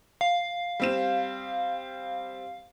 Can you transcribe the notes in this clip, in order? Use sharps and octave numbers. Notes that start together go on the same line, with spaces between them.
F5
G3 C4 E7